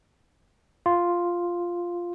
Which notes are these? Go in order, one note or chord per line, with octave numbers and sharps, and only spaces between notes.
F4